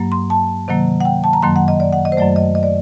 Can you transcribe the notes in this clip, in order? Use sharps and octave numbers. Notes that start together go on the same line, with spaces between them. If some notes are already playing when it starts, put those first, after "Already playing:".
Already playing: G2 F#3 A#3
C6
A5
C3 D#3 F#3 A#3
F#5
G5
A5
A#5
F#2 D#3 F#3 A#3 C6
F#5
D#5
D5
F#5
D#5
C5
F#2 F#3 A3 D5
D#5
D#5
D5